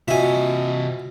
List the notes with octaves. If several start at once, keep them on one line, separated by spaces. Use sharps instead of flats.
C3 F4 F#4 D#5 E5 G#5